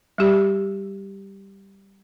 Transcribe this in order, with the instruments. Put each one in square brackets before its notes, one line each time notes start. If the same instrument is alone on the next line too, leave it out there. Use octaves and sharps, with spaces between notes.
[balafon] G3 G4